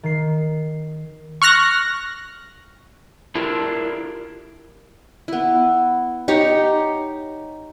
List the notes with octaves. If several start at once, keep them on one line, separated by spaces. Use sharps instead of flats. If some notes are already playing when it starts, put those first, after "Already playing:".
D#3 C7
C#6 F6 F#6 A#6
D4 E4 F4 G4 A4 A#4
B3 E4
D#4 G4 C#5